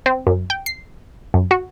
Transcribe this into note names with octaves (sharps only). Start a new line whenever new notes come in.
C4
F#2
G5
C7
F#2
F#4